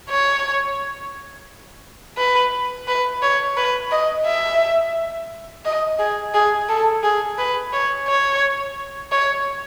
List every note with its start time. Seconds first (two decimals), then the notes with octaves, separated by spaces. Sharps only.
0.10 C#5
2.18 B4
2.88 B4
3.22 C#5
3.57 B4
3.91 D#5
4.26 E5
5.65 D#5
5.99 G#4
6.34 G#4
6.69 A4
7.03 G#4
7.38 B4
7.73 C#5
8.08 C#5
9.11 C#5